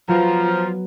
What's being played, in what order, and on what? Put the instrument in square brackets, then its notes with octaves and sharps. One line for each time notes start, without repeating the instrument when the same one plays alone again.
[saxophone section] F3 [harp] F#3 B3 [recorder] F4 [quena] A#5